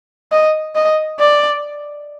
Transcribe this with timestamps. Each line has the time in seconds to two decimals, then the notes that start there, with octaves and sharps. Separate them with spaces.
0.32 D#5
0.75 D#5
1.20 D5